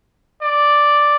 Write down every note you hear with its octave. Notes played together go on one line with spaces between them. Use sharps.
D5